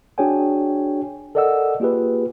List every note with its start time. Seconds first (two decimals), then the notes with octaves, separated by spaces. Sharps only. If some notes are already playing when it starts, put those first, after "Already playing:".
0.18 D4 F#4 G#4 C#5 G5 G#5
1.35 A4 A#4 D5 D#5 F#5 E6
1.80 A#3 F4 G4 G#4 B4